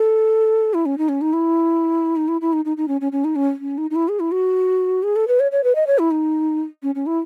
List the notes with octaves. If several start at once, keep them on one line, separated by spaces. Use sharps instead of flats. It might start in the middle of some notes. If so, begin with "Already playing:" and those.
Already playing: A4
E4
C#4
D#4
C#4
D#4
E4
D#4
E4
E4
D#4
D#4
D#4
C#4
C#4
C#4
D#4
C#4
C#4
D#4
D#4
E4
G#4
E4
F#4
G#4
A4
B4
C#5
C#5
B4
D#5
C#5
E4
D#4
C#4
C#4
E4